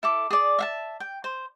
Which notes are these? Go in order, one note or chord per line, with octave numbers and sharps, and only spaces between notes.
E4 A4 D6
G#4 D5
E5 F5 A5
G5
C5